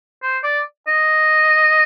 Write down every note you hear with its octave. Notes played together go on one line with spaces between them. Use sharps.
C5
D5
D#5